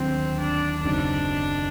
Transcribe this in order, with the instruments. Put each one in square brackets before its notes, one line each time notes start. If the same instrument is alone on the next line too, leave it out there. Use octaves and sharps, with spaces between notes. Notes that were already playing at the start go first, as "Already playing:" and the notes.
Already playing: [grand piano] D#2 D3 F#3 [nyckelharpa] C4
[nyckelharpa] D4
[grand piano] F#1 F#2 F#3 C4 D#4 [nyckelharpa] D4